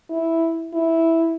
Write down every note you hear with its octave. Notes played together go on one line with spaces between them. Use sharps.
E4
E4